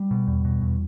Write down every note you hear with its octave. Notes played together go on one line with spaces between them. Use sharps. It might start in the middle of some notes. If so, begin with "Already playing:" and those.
Already playing: G3
B2
E2
B2
E2